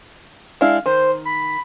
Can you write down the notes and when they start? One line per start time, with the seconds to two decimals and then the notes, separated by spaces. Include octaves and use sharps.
0.61 G#3 D4 E4 F5
0.86 D#3 C5
1.25 B5